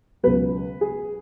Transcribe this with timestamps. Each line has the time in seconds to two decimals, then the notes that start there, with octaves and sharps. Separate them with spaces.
0.23 C#2 B2 F#3 B4
0.81 G#4